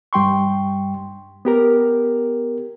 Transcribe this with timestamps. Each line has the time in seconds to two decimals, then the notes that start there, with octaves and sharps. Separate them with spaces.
0.13 G2 G3 G5 C6 C#6
1.45 B3 G4 A#4